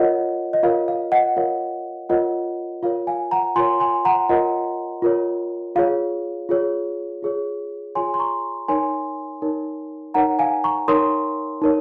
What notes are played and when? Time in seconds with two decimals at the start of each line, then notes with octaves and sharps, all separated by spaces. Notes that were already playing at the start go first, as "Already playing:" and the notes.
Already playing: F4 A#4 C#5 D#5 F#5
0.53 D#5
0.63 F4 A#4 C#5 F5
0.88 F5
1.12 D#5 F#5
1.36 F4 A#4 C#5 F5
2.09 F4 A#4 C#5 D#5 F#5
2.83 F4 A#4 C#5 F5
3.07 F5 G#5
3.31 F#5 A#5
3.56 F4 A#4 C#5 G#5 C6
3.80 G#5 C6
4.05 F#5 A#5
4.29 F4 A#4 C#5 D#5 F#5
5.02 F4 A#4 C#5
5.76 F4 G#4 C#5 F5
6.49 F4 G#4 C#5
7.22 F4 G#4 C#5
7.95 F4 G#4 C#5 G#5 C6
8.14 C6
8.19 A#5 C#6
8.68 D#4 A#4 C#5 G#5 C6
9.42 D#4 A#4 C#5
10.14 D#4 A#4 C#5 F#5 A#5
10.39 F5 G#5
10.64 A#5 C#6
10.88 D#4 A#4 C#5 C6 D#6
11.62 D#4 A#4 C#5